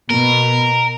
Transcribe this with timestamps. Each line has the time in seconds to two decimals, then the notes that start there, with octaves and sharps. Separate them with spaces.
0.10 B2 A#4